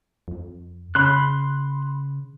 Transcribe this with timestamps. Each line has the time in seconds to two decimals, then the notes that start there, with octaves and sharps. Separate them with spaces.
0.28 F2
0.95 C#3 B5 C6 F#6